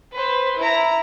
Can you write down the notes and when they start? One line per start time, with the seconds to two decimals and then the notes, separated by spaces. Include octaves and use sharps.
0.13 B4 C5
0.57 E4 A#5